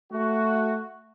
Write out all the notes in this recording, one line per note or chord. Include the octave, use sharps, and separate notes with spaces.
A3 F#4